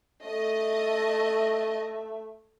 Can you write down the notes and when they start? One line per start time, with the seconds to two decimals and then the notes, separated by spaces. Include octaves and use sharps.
0.25 A3 D#5 E5